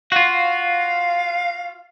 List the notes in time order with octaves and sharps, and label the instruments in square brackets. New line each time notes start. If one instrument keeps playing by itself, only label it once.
[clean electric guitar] F4 F#4 [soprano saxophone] F5